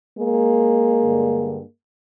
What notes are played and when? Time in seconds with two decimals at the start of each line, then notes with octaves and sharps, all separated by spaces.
0.18 G#3 A#3
1.01 G2 D3